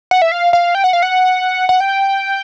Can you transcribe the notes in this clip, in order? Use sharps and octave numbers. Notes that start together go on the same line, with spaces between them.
F#5
E5
F5
F5
G5
F#5
F5
F#5
F#5
G5